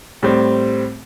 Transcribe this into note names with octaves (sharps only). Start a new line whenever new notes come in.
A2 G3 C4